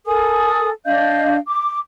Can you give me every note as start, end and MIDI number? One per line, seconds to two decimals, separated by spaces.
0.06 0.69 69
0.06 0.69 70
0.06 0.69 80
0.06 0.69 87
0.86 1.37 62
0.86 1.37 75
0.86 1.37 77
0.86 1.37 91
1.46 1.78 86